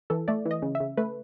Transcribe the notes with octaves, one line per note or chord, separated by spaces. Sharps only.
E3 A4
A3 D5
E3
D#5
C#3
E5
C#3
A3 B4